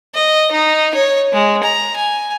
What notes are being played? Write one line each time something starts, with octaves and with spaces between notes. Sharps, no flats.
D#5
D#4
C#5
G#3
A#5
G#5